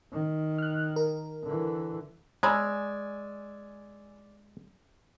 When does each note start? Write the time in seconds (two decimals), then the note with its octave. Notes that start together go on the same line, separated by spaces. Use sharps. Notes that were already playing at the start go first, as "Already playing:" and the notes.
0.12 D#3
0.58 F6 F#6
0.96 A#4
1.44 D3 E3
2.43 G#3 C#5 D5 G#5 A#5 B5 E6